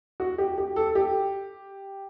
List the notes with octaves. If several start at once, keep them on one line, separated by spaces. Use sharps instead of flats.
F#4
G4
G4
A4
G4